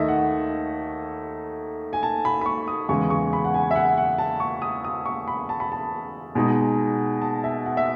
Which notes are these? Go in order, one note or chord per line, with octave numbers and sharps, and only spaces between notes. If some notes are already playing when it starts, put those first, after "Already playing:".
Already playing: D#2 D#3 A3 D#4 D#5 E5
F#5
G#5
A5
B5
B5
C#6
D#6
E2 C#3 G#3 B3 C#6
C#6
B5
F#5
G#5
E5
F#5
F#5
A5
C#6
D#6
D#6
C#6
B5
A5
B5
A5
B2 G#3 D#4
A5
E5
F#5
E5